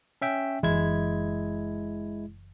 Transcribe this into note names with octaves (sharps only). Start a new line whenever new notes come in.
C#4 E5 G5
F#1 B1 E3 G#3 E4 G#6